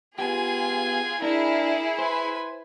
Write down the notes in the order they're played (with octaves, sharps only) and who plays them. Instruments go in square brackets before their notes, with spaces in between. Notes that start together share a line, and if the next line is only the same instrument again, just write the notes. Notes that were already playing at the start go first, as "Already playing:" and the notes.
[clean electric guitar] B3 G4 [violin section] F4 G#4 [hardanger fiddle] G#5
[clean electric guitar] D4 [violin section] E4 G#4 [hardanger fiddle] A#4
[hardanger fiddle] B4 G#5 [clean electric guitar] C5